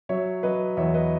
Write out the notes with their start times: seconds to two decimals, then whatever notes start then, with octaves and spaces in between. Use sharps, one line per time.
0.09 F#3 C#5 E5
0.43 F#3 B4 D#5
0.77 E2 C#5 E5
0.94 B4 D#5